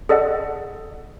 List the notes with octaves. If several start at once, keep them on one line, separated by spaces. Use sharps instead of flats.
G#4 A4 D5 D#5 F#5